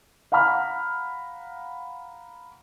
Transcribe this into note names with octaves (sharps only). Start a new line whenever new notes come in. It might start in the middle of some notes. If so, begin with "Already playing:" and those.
F5 F#5 A#5 B5 F6